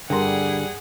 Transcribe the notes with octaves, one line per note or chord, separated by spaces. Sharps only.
G2 D3 G3 G#4 A#4 F#5 A#5 C6